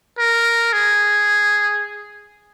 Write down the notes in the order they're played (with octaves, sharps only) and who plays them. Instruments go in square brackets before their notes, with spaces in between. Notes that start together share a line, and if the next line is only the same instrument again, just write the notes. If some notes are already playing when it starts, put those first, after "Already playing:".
[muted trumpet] A#4
G#4